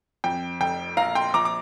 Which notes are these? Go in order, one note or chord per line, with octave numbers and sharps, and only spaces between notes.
F2 G5
F1 G5
A#1 F5 A#5
G5 C6
A#1 A#5 D6
D6